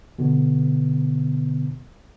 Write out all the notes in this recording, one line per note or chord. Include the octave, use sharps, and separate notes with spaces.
B2 D3 B3